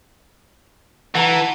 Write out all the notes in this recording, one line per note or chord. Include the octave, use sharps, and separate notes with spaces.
E3 F#5 A5 A#5